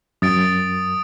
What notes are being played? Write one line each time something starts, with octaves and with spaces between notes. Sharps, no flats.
F#2 D#6 A6 D7